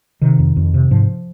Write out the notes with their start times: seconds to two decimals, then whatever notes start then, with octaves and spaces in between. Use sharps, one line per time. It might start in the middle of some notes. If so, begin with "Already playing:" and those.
0.21 C3 D#3
0.39 F2
0.56 F2
0.74 C3
0.91 G#2 F3